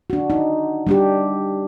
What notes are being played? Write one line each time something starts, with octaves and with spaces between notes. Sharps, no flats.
D4 F#4
D#4
G3 D4 G4